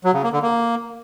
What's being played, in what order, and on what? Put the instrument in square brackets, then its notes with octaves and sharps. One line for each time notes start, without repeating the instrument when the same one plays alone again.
[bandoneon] F#3
C#3
A#3
D3
A#3